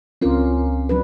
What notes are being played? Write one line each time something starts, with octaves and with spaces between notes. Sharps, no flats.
C#2 C4 C#4 F4 A#4
F#3 D4 B4